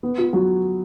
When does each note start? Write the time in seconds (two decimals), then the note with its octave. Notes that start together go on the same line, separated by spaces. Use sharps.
0.03 B3
0.18 F4
0.33 F#3